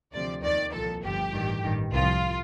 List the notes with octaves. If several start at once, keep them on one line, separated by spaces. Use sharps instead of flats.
D2 C3 F3 D5
D#2 D#3 D5
C2 A#2 F3 A4
G1 G2 F3 G4
A1 G2 D#3
A1 G2 D#3
C2 C3 F3 F4